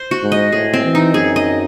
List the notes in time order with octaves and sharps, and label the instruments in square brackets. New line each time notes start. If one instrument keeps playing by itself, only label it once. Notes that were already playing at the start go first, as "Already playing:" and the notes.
Already playing: [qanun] C5
F#4
[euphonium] G#2
[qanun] D#5
[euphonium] A2 [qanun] G#4
[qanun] C4
[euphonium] E3
[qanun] D#4
[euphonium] F#2 [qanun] G#4
[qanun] D#5